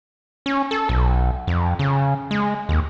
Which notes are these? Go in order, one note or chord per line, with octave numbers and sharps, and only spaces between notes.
C#4
A4
B1
F2
C#3
G#3
D#2